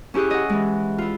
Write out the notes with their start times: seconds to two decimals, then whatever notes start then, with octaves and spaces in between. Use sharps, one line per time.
0.14 C#4 E4 G4 G#4 F#6
0.30 D#5 F#5
0.49 E3 G#3
0.98 E4 F4